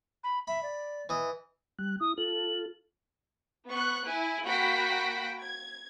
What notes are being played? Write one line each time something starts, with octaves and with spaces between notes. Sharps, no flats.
B5
E5 B5
D5
E3 D#5
G3 F#6
E4 D#6
F4 A4 F#7
B3 C#6 F#6
E4 G#5
A#3 F#4 G5 B5 B6 D7
G#6